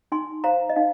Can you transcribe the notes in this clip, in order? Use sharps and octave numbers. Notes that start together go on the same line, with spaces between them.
D#4 G#5 C6
C5 F5 A#5
D#5
D#4 F5